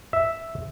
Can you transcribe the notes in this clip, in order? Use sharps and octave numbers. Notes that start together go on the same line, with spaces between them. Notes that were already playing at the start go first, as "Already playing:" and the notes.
E5